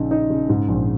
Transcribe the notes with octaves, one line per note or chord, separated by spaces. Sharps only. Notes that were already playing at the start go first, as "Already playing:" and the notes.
Already playing: A#1 C#3 D#4
D#4
C#3
G#2
A#1